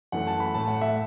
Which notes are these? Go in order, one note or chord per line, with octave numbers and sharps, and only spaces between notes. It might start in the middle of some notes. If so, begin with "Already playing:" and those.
F#2 E3 A3 F#5
A5
B5
A2 A3 A5
F#5
E5